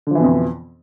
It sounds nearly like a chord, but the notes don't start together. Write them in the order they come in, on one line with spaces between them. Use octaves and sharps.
D3 F3 E3 B2 F2